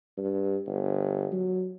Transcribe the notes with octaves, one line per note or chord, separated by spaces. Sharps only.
G2
G1
F#3